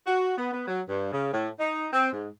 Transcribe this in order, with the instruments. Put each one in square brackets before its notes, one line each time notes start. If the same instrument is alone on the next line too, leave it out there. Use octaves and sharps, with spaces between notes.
[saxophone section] F#4
B3
B3
F#3
G2
C#3
A2
D#4
C4
G#2